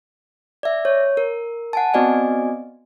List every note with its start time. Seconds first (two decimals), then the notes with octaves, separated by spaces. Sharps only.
0.63 D5 E5
0.85 C#5
1.17 A#4
1.73 F#5 G#5 A5
1.94 B3 C4 F#4 D5 D#5 G#5